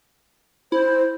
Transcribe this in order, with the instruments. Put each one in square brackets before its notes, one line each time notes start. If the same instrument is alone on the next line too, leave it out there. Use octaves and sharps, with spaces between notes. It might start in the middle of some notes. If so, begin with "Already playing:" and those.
[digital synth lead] E4 [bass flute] C5